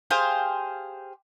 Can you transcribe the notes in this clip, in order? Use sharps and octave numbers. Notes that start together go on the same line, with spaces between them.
G4 G#4 C5 F5